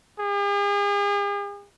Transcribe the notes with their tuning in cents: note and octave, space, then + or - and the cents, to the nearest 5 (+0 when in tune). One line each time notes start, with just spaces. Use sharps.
G#4 -45